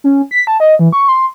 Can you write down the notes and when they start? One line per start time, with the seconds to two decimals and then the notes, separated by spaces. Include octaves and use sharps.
0.04 C#4
0.31 B6
0.47 A5
0.60 D#5
0.79 E3
0.93 C#6
1.08 C6